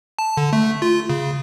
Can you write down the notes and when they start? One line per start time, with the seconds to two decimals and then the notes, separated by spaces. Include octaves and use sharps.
0.19 A5
0.37 D3
0.53 A3
0.82 F4
1.10 C#3